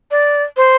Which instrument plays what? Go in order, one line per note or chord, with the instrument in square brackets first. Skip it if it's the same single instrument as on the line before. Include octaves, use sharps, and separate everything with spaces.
[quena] D5
C5